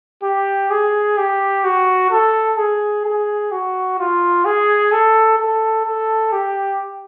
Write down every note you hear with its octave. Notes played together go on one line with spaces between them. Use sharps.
G4
G#4
G4
F#4
A4
G#4
G#4
F#4
F4
G#4
A4
A4
A4
G4